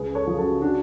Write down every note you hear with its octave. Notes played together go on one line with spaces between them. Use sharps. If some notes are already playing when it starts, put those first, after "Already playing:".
Already playing: C#2 G#4 B4
A4 C#5
C#3 F3
F#4 A4
D4 F#4